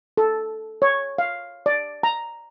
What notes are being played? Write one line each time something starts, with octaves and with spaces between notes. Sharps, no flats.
A4
C#5
F5
D5
A#5